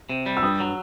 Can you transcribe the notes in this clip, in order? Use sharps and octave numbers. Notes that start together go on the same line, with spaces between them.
C3
G3
E6
G2 D#6
F#3